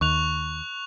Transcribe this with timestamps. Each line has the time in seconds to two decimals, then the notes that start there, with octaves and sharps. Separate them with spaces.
0.01 D#2 C#6 F#6 F7